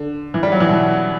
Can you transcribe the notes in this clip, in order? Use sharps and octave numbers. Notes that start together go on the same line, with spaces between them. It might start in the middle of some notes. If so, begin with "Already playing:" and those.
Already playing: D3
E3
G3
F#3
E3
B2